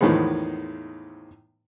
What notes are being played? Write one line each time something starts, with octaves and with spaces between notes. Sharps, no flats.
E2 A2 D#3 F3 G#3 B3